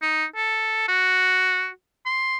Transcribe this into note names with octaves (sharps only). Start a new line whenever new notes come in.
D#4
A4
F#4
C6